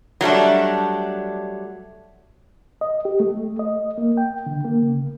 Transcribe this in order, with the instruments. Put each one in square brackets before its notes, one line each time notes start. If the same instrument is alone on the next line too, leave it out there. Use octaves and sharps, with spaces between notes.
[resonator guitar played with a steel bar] F#3 G3 A3 D4
[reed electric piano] D#5
G4
A3
D#5
A#3
G5
D3
A#3
C#3